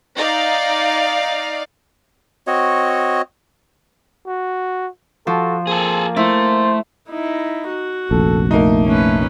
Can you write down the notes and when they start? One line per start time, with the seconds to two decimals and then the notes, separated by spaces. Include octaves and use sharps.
0.16 D#4 D5 F5
2.47 C4 F#4 C#5 D#5
4.27 F#4
5.27 F3 F#4 A4
5.67 A#3 C4 G#4 A4
6.17 A3 E4 C5
7.10 D#4 E4
7.69 F#4
8.11 F1 A#1 A4
8.51 A3 A#3 D#4
8.87 A3 C#4 B4